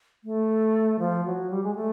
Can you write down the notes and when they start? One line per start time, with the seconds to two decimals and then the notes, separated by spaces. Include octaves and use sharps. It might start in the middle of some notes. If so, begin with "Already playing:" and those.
0.24 A3
0.99 F3
1.25 F#3
1.50 G3
1.63 G#3
1.75 A3